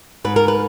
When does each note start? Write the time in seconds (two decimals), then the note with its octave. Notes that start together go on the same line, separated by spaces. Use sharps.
0.24 G#2 B4
0.36 A#4
0.48 B4